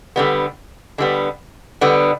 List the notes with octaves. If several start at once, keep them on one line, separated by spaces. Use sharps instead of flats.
D3 G3 B3
D3 G3 B3
D3 G3 B3